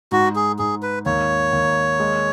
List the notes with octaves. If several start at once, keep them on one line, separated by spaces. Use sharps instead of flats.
G#2 F#4
G#4
G#2 G#4
B4
D#2 C#5
D#2
G#3